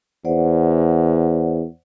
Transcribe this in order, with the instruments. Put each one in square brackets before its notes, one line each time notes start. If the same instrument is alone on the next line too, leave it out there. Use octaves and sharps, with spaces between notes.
[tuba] E2 [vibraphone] C5 D5 F#5